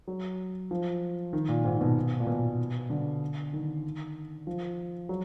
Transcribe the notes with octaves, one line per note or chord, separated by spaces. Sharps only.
F#3
F3
D#3
A#2
G#2
B2
A#2
B2
D3
D#3
F3
F#3